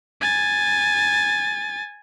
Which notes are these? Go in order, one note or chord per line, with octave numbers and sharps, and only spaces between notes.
G#5 A6